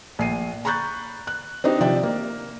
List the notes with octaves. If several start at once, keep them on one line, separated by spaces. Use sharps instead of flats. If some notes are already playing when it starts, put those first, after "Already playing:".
A#1 C7 D#7
A#5 B5 C#6 F#6 G6 A6
F#6
C4 D4 D#4 G4
C3 F3 D5 E5 G5
A#3